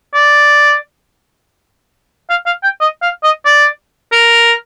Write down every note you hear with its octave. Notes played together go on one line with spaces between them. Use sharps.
D5
F5
F5
G5
D#5
F5
D#5
D5
A#4